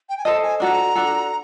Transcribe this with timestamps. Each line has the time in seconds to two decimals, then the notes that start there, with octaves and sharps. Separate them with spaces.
0.09 G5
0.18 G#5
0.25 A4 C5 D#5 A5
0.43 G#5
0.60 D4 F#4 A4 A#5
0.95 D4 F#4 A4